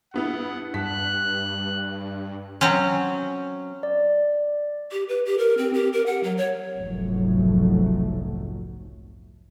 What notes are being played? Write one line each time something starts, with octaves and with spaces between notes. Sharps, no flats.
G2 B3 E4 F#5
G2 A5 F#6 B6
F#3 C4 C#4
D5
G4
B4
G4
A#4
C4
G4
A#4
F#5
F#3
C#5
F1 B1 G#2 F3 F#3 A3